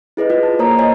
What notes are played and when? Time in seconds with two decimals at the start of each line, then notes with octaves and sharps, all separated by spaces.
0.17 E4 G#4 B4 D#5
0.30 F4 D#5
0.43 A5
0.59 A#3 A#4 C5 C#5 A#5 D#6
0.78 C5 C#5 D#5 G#5